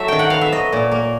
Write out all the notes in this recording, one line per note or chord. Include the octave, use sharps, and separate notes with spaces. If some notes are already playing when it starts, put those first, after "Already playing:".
Already playing: F#3 A3 E5
D#3 G5
F#5
B3 F5
E5
F#3 D#5
A#2
A#3